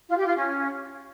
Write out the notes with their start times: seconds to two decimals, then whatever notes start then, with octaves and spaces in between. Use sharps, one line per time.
0.09 F4
0.17 G4
0.26 F4
0.35 C#4